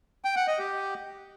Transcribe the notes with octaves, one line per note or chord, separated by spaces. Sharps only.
G5
F#5
D#5
G4